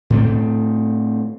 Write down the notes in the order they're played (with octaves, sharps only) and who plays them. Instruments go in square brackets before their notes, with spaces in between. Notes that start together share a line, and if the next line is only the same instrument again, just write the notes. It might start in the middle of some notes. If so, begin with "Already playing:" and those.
[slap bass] A2 A3 C4